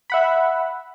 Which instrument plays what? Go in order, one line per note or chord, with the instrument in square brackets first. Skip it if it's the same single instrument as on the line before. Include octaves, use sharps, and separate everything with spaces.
[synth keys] E5 F#5 B5